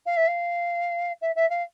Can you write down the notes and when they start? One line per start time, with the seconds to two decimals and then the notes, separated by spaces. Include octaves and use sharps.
0.06 F5
0.17 E5
0.27 F5
1.21 E5
1.35 E5
1.50 F5